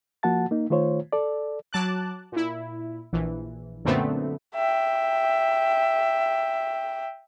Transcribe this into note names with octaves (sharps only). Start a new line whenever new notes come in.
F3 A#3 F#4 F#5 A5 A6
A#3 D#4
D#3 A3 F4 C5 C#5
A4 D5
F#3 A5 D6 F#6
A#2 E4
A#1 E3
F#2 A#2 D3 A3 B3 C4
E5 G5